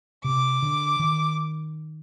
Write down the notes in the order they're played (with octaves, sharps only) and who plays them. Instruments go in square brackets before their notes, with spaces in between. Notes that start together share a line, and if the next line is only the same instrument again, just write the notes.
[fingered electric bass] C3 [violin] D6
[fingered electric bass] D3
D#3